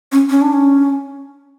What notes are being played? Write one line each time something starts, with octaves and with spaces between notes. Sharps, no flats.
C#4
C#4
D4
C#4